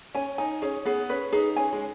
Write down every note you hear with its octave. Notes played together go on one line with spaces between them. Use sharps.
C#4 G#5
D#4 G#5
C#4 G#4
B3 G#4
C#4 B4
D#4 G#4
C#4 G#5
G#3